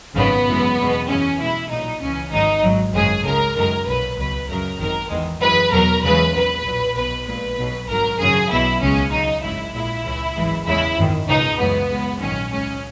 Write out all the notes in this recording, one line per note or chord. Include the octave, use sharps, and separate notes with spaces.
G#1 F#2 C#3 B3
F#2 E3 G#3
E2 B2 G#3
F#2 C#3 E3 G#3 C#4
B1 B2 G#3 E4
B1 A#2 F#3 D#4
C#2 C#3 E3 C#4
G#1 G#2 D#3 F#3 D#4
G#1 G#2 F#3
G#1 F#2 C#3 G#3 G#4
C#2 C#3 G#3 A#4
F#2 D#3 G#3 A#4
B1 A#2 F#3 B4
C#2 B2 F#3 B4
F#2 C#3 F#3 A#4
G#1 F#2 D#3 A#4
E2 D#3 G#3
F#2 E3 G#3 B4
E2 B2 F#3 A#4
E2 C#3 E3 G#3 B4
A#1 A#2 F#3 B4
B1 A#2 F#3
B1 B2 F#3 B4
A#1 A#2 G#3 B4
B1 B2 F#3
G#1 G#2 F#3 A#4
G#1 F#2 C#3 F#3 G#4
B1 B2 F#3 E4
C#2 C#3 G#3 C#4
F#2 C#3 F#3 D#4
G#1 F#2 C#3 G#3 E4
A#1 A#2 G#3 E4
C#2 C#3 E3
G#1 F#2 E3 G#3
E2 C#3 G#3 E4
G#1 F#2 D#3
C#2 B2 G#3 D#4
F#2 C#3 E3 G#3 B3
F#2 C#3 G#3
A#1 G#2 D#3 F#3 C#4
C#2 C#3 G#3 C#4